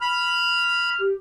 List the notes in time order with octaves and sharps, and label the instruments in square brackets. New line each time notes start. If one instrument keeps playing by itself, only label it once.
[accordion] B5 [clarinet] F6
[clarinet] G4